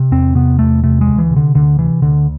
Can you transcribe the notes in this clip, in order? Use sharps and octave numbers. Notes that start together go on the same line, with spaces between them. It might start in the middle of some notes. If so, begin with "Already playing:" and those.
Already playing: C3
E2 C4
C3 B3
E2 A3
C3 A3
G#3
D2
E3
C3
D3
D2 D3
C3 E3
D2 D3